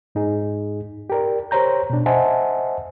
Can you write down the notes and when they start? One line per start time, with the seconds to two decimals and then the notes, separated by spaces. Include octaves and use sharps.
0.15 G#2 D#4 G#4
1.10 G4 A#4 D5
1.51 G4 C5 C#5 A#5 G6
1.90 B2 D4
2.06 C5 D#5 E5 F#5 G#5 A5